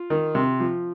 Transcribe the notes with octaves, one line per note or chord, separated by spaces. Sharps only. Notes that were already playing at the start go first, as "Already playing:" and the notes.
Already playing: F4
D#3
C3
F3